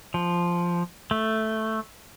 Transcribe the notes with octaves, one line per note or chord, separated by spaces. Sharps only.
F3
A3